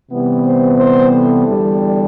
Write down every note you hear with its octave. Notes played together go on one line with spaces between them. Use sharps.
C3 E3 G3 B3
C5
C5
A4
E2 D3 G3